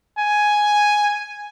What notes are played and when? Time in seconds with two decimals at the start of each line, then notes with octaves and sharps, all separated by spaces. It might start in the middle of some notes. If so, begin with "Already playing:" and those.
0.19 G#5